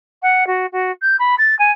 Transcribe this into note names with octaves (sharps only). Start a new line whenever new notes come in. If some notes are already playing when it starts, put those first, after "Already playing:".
F#5
F#4
F#4
G6
B5
A6
G#5